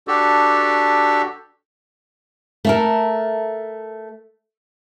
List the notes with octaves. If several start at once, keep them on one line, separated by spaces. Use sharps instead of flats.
D4 F#4 G4 A4
A3 A4 A#4